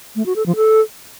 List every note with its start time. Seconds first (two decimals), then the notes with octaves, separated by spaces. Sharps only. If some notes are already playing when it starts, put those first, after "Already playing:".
0.16 A3
0.26 F#4
0.36 A4
0.46 F3
0.56 A4